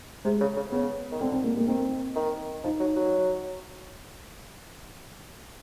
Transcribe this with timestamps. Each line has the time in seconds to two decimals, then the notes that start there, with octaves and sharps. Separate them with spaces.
0.25 C3 G#3
0.41 C#3
0.56 C#3
0.72 C#3 B3
1.12 D#3
1.20 D3 C4
1.32 C4
1.44 A#3
1.57 A#3
1.68 D#3 C4
2.16 D#3
2.64 F3 D#4
2.80 F#3
2.96 F#3